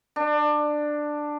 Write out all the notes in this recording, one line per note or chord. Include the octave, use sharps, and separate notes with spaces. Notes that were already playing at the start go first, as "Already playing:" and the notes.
D4